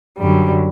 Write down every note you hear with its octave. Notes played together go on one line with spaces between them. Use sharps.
F#2 D3 F#3 G3